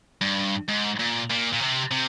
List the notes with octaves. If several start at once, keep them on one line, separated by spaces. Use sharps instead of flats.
G2
G#2
A#2
A#2
A#2
C3
C3